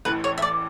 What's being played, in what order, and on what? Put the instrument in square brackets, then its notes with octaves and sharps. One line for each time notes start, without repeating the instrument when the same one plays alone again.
[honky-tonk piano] A1 A2 E3 [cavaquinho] B4
[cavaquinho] C#5
E5
D5